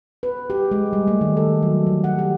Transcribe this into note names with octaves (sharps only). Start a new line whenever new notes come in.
B4
G4
G#3
G3
A3
D#3
A4
F#3
E3
F#5
G4